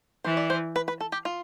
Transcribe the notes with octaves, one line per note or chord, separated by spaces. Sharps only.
E3 C5
D5
C5
B4
B4
A4
G4
F4